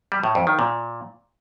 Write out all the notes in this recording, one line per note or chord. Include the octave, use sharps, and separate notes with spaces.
G3
A2
F2
D#3
A#2